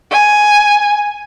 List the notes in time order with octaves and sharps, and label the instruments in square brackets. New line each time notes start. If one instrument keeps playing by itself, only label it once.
[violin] G#5